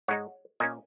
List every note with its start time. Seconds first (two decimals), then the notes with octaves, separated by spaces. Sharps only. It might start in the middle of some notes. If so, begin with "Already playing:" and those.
0.08 G#2 G#3 D#4 C#5 F#5
0.60 A#2 A#3 C#4 D#5 G#5